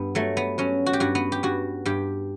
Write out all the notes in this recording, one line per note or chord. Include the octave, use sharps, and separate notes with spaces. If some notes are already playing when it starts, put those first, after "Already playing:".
Already playing: G2 B3
F#3 A3
B3
F#3 C#4
F#4
G4
G2 F#4
B3
G4
G2 F#4
G2 G4